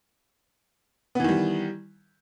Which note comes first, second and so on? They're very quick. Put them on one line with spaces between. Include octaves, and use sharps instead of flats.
B3 E3 D#3 G3